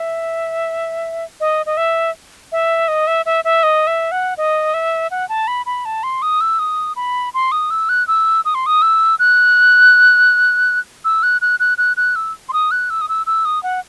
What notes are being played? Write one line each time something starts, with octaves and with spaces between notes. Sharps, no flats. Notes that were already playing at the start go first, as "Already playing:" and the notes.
Already playing: E5
D#5
D#5
E5
E5
D#5
E5
E5
E5
D#5
E5
F#5
D#5
E5
F#5
A5
B5
B5
A5
C6
D#6
E6
D#6
B5
C6
D#6
E6
F#6
E6
D#6
C6
D#6
E6
F#6
E6
F#6
F#6
F#6
F#6
F#6
E6
C6
D#6
F#6
E6
D#6
E6
E6
D#6
F#5